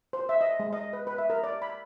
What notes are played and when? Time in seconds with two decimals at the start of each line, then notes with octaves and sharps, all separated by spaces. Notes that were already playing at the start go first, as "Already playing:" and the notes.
0.13 C5
0.29 E5
0.41 D#5
0.60 G#3
0.73 D#5
0.93 B4
1.07 B4
1.18 E5
1.30 A#4
1.44 D5
1.62 B5